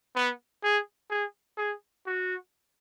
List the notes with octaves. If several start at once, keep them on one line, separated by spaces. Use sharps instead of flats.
B3
G#4
G#4
G#4
F#4